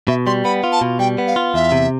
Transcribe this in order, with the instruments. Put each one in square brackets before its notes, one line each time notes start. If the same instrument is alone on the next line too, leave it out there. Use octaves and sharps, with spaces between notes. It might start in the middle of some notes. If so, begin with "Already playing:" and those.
[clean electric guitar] B2 [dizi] E5
[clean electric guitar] G3 [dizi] C6
[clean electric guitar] B3 [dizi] B5
[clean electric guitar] F4
[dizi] A5
[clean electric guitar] B2
[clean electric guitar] G3 [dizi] G5
[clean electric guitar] B3
[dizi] F5
[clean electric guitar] F4
[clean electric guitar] E2 [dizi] E5
[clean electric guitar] C3